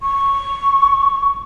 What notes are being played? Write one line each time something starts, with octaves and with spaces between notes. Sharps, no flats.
C#6